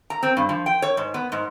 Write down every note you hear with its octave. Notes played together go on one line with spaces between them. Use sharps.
A#5
C4
G2
F3
G5
C#5
G#2
B3
G#2